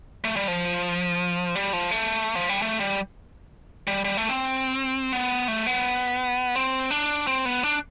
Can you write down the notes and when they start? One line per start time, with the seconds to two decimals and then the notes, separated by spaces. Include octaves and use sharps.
0.24 A3
0.36 G3
0.48 F3
1.55 G3
1.73 F3
1.91 A3
2.35 F3
2.49 G3
2.62 A3
2.80 G3
3.87 G3
4.05 G3
4.17 A3
4.29 C4
5.12 B3
5.48 A3
5.67 B3
6.56 C4
6.91 D4
7.27 C4
7.45 B3
7.63 D4